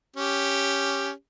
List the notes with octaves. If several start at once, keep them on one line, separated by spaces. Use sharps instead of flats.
C#4 G4